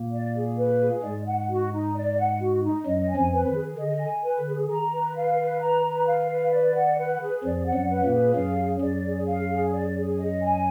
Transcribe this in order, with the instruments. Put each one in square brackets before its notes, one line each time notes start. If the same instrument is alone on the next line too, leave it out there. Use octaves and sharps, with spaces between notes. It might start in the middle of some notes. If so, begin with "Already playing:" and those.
Already playing: [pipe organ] A#2 A#3
[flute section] D5
G#4
B4
G#4
[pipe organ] G#2 G#3 [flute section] D5
[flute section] F#5
F#4
D#4
D5
F#5
F#4
D#4
[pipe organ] F#2 F#3 [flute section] D#5
[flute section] G#5
[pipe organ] F2 F3
[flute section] B4
[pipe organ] D#3
[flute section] G#4
[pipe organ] D3 [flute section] D#5
[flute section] G#5
B4
[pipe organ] D3
[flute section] G#4
[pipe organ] D#3 [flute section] A#5
[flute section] B4
F5
B4
A#5
B4
F5
B4
D5
F#5
B4
G#4
[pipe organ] F2 F3 [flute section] D5
[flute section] F#5
[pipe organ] F#2 F#3
[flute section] B4
[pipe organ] A#2 A#3
[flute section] G#4
[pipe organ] F#2 F#3 [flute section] F5
[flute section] G#4
[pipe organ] F#2 F#3 [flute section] D5
[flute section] G#4
F5
G#4
D5
G#4
D#5
G#5